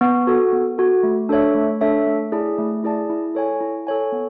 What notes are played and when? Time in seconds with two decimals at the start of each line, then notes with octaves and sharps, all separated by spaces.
0.01 B3
0.27 F#4 A4
0.52 B3
0.78 F#4 A4
1.03 A3
1.29 D4 A4 C#5 E5
1.55 A3
1.81 D4 A4 C#5 E5
2.06 A3
2.32 E4 G#4 D5 A5
2.58 A3
2.84 E4 G#4 D5 A5
3.10 E4
3.35 A4 C#5 G#5
3.61 E4
3.87 A4 C#5 G#5
4.12 B3